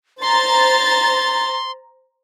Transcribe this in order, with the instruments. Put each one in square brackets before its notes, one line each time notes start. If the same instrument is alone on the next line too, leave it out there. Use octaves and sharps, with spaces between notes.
[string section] C5 A#5 A6 [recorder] C6